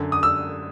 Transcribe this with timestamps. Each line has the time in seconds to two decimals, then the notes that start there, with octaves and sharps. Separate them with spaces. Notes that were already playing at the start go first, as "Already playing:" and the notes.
Already playing: F#2 D3
0.12 D#6
0.23 E6